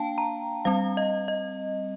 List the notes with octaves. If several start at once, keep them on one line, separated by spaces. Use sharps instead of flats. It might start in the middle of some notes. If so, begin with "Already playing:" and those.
Already playing: A#3 D4 F5 G5 A5
A#5
G3 C4 F5
D#5
D#5